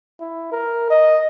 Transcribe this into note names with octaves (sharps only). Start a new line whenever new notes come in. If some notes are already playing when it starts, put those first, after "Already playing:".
E4
A#4
D#5